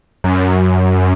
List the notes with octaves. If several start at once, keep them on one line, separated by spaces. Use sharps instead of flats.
F#2